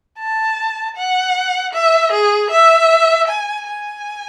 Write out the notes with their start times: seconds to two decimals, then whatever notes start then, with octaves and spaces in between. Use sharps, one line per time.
0.18 A5
0.96 F#5
1.73 E5
2.12 G#4
2.51 E5
3.28 G#5
3.67 G#5